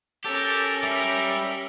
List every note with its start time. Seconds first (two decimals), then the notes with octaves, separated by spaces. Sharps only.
0.25 C#4 G4 A4 A#4 A5
0.83 G3 E5